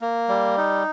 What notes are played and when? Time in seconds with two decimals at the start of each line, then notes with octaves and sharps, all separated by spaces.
0.01 A#3
0.29 G3
0.58 D#4